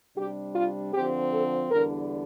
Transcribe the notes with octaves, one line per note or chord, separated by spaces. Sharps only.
C3 G3 D4 G4
F4
D3 F3 C4 G4
A4
E2 D3 G3 D4 A#4